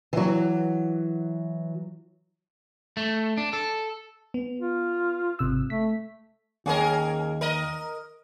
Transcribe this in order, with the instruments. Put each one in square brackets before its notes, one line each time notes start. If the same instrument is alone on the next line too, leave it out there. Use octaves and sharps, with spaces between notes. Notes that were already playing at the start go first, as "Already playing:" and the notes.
[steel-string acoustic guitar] E3 F#3
[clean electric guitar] A3
D4
A4
[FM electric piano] B3
[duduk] F4
[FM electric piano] G#1 C3 E6
[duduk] A3 [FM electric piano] B6
[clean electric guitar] D#2 [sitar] C#4 G#4 A#4
[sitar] A#4 D#5